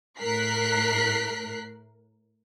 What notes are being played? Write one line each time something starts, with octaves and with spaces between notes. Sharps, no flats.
A2 A#4 F#6 B6 C7